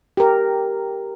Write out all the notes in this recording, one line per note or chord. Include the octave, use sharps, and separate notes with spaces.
G4 A#4